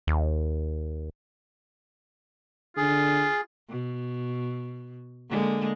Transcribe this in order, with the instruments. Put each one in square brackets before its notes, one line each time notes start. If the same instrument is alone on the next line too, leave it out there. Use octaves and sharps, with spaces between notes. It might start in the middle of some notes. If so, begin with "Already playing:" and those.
[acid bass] D#2
[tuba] D3 [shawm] F4 [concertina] G#4
[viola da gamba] B2
D3 G#3 A#3